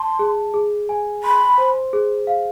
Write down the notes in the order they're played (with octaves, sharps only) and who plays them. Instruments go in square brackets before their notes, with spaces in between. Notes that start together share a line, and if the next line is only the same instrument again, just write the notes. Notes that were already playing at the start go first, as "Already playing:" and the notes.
Already playing: [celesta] A5 [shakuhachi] C6
[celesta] G#4
G#4
G#5
[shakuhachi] B5 [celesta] C6
[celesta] C5
G#4
F5